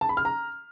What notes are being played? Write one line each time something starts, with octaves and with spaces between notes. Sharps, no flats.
A5
B5
F6
A#5